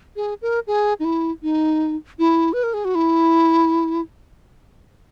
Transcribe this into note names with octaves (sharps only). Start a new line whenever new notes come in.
G#4
A#4
G#4
D#4
E4
D#4
E4
B4
A#4
G#4
F#4
E4